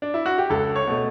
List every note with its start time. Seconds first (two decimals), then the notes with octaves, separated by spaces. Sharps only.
0.02 D4
0.14 E4
0.26 F#4
0.38 G4
0.50 C#2 A4
0.76 C#5
0.87 B2 A3